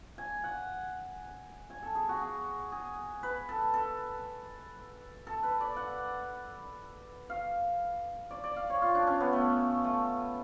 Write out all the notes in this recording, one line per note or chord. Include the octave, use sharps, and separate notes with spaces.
G#5
F#5
G#5
A4
G#4
F#4
G#4
G#4
B4
A4
A4
A4
B4
D5
F#5
F5
D5
D5
F5
C#5
F4
D4
C#4
B3
A3
A3